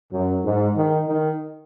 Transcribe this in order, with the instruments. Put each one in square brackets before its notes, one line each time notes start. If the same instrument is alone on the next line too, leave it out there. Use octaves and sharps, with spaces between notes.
[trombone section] F#2
G#2
D#3
D#3